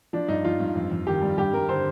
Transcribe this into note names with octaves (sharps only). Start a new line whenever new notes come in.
F3 D4
G2 D#4
F3 F4
G2
F2
F2
D#3 G4
G3
G2 G4
G2 A#4
D3 C5